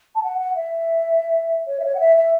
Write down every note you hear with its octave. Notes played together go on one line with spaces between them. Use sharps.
A5
F#5
F#5
E5
C#5
E5
C#5
F#5
E5
E5